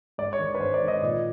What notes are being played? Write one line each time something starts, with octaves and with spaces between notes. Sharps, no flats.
G#2 D5
C#5
D#3
B4
G#2 C5
D5
D#3
D#5
A#2 D5